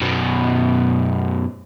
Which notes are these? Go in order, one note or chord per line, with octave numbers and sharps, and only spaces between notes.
F#2 B2